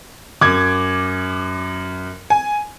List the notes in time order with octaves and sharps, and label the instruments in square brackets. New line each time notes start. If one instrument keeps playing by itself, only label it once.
[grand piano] F#2 [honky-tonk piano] D6 G#6
[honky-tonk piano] G#5